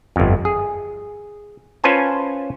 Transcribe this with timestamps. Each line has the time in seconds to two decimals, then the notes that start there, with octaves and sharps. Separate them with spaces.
0.16 G1 F2
0.45 G#4
1.84 C#4 F4 B4 C5 G#5 A5